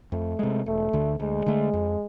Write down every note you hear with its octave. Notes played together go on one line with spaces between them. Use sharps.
F2 A3
C3 G#3
E1 A3
D2 D3
D2 G#3
D3 A3
F2